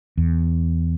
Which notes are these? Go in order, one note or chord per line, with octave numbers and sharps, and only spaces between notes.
E2